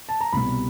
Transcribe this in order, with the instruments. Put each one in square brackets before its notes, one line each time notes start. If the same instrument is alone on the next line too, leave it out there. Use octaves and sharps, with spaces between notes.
[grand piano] A5
A#5
C2 B2 G3 B5